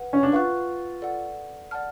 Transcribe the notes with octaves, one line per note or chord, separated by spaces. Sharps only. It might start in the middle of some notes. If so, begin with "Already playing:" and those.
Already playing: B4 F#5
C#4
D4
F4 B4 F#5 C#6 F#6
A4 D5 F#5
D5 F#5 A5 F6